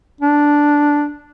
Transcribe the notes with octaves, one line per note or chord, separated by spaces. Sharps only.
D4